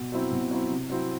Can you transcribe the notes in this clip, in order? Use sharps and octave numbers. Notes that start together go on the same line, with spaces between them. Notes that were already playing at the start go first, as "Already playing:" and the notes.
Already playing: B2
F#3 C4 E4
B2
F#3 C4 E4
C3
F#3 C4 E4